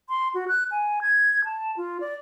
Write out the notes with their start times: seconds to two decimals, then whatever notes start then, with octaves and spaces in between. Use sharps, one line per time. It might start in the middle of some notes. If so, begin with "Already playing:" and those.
0.09 C6
0.34 F#4
0.48 F#6
0.71 G#5
1.02 G#6
1.45 A5
1.77 F4
2.01 D5